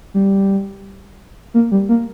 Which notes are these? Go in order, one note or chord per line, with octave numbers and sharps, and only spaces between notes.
G3
A#3
G3
A#3